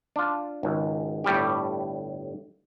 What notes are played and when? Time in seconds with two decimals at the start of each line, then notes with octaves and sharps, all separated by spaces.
0.16 D4 F4
0.63 G#1 C#2
1.24 G1 A2 G3 G4